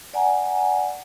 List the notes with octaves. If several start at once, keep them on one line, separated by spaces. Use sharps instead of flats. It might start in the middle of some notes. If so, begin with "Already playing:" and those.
D5 F#5 G#5 A#5